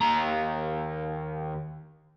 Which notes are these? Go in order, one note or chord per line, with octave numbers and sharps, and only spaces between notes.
D#2 A#5